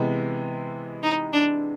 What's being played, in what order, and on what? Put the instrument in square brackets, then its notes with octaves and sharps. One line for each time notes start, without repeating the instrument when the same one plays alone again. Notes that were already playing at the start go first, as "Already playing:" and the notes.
Already playing: [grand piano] C3 E3 G#3 B3
[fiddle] D#4
D4